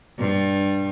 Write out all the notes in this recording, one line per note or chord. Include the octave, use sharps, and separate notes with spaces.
G2